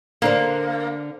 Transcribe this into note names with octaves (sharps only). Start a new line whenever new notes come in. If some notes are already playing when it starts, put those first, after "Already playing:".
D3 A#3 D4 C5